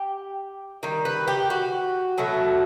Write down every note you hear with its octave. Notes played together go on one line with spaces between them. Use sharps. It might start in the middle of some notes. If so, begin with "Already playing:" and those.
Already playing: G4
D#3 G3
B4
G4
F#4
B2 F#3 A3